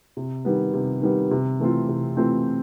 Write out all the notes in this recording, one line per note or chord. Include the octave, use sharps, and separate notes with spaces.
C3
D#3 G3 B3
C3
D#3 G3 B3
C3
E3 A3 C4 F4
C3
E3 A3 C4 F4